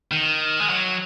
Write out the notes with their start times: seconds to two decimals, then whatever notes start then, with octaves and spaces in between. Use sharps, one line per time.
0.11 D#3
0.60 G#3
0.70 F#3